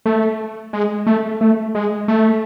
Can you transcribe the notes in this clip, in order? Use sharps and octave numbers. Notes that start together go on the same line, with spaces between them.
A3
G#3
A3
A3
G#3
A3